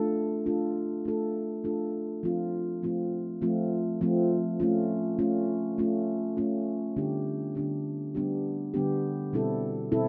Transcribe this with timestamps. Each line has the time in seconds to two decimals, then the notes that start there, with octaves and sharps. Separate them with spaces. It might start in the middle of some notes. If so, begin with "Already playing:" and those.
Already playing: A3 D4 F4 A4
0.46 A3 D4 F4 A4
1.05 A3 D4 F4 A4
1.64 A3 D4 F4 A4
2.23 F3 A3 C4 F4
2.83 F3 A3 C4 F4
3.41 F3 A3 C4 F4
4.01 F3 A3 C4 F4
4.60 A3 C#4 F4
5.19 A3 C#4 F4
5.78 A3 C#4 F4
6.37 A3 C#4 F4
6.97 D3 G3 B3 D4 G4
7.55 D3 G3 B3 D4 G4
8.15 D3 G3 B3 D4 G4
8.74 D3 G3 B3 D4 G4
9.33 B2 G3 C4 E4 A4
9.92 B2 G3 C4 E4 A4